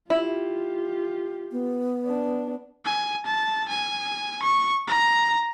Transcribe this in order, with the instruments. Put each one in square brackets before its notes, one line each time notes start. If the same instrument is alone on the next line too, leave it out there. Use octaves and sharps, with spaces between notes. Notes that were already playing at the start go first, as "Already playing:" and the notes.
[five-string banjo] E4 [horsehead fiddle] F4 G4
[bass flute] B3
[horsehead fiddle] D4
[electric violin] G#5
A5
G#5
C#6
A#5